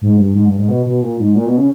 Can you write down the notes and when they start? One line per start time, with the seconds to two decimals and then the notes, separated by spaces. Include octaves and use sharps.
0.02 G#2
0.19 G2
0.35 G#2
0.46 G2
0.58 G#2
0.69 B2
0.86 B2
1.02 A#2
1.19 G#2
1.35 A#2
1.46 B2
1.57 C#3